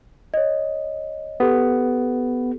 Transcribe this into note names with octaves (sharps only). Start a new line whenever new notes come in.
C#5 D#5
B3 G4 A4